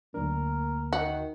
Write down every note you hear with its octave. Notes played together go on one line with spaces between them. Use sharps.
D2 F#3 A#3 D4 A#4
D#3 F#4